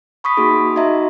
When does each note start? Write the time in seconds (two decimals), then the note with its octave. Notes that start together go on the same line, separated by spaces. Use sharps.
0.24 B5 C#6 D#6 B6
0.37 A#3 D#4 F#4 G#4
0.76 D#4 F#4 D#5 E5 A#5